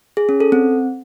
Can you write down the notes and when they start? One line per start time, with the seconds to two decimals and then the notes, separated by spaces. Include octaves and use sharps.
0.17 G#4
0.29 C#4
0.40 A4
0.52 C4